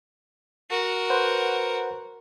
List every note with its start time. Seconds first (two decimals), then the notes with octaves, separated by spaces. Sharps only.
0.71 F#4 A#4
1.10 B4 C5 F#5